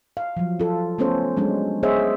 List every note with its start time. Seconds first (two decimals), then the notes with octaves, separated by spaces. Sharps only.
0.17 F5
0.37 F3 F#3
0.60 F4 A4
0.98 A3 B3 C#4 A4 C5 C#5
1.37 F#3 G#3 C#4 D4
1.83 B3 G#4 C5 C#5 D#5 E5